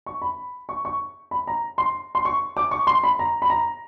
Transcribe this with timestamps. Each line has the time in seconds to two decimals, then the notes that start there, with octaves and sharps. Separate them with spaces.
0.06 C#6
0.22 B5
0.69 C#6
0.85 C#6
1.31 B5
1.47 A#5
1.78 C6
2.15 C6
2.25 C#6
2.57 D6
2.71 C#6
2.87 C6
3.04 B5
3.19 A#5
3.42 B5
3.50 A#5